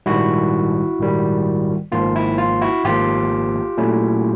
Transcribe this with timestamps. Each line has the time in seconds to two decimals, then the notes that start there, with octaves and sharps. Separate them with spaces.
0.06 A#1 G#2 D#3 G3 E4 F#4
0.99 A#1 G#2 D#3 G3
1.92 G#1 G#2 F3 A#3 F4
2.16 E4
2.38 F4
2.61 E4 F#4
2.85 G#1 G#2 F3 A#3 F4 G4
3.77 A#2 F#3 A3 C#4 E4